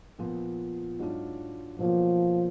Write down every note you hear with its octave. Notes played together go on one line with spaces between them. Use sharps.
A#2 F3 B3
G#2 F#3 D4 F4
B2 F3 F#3 A#3